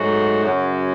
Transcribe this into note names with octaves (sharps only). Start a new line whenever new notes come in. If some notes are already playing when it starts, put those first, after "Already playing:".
Already playing: G#2 F#3 A3 D#4 F#4
F#2 C#3 F#3 C#4 F#4